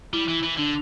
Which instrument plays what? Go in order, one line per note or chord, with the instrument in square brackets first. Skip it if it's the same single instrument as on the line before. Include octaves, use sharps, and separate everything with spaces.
[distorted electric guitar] G3 [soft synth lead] E4
[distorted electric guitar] E3
E3
[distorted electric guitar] D3 [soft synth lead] D4